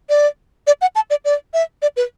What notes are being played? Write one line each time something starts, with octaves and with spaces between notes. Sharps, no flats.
D5
D5
F#5
A5
D5
D5
E5
D5
B4